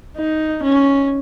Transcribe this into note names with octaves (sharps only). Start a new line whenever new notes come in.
D#4
C#4